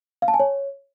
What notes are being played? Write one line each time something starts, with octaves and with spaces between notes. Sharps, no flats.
F5
A5
G#5
C#5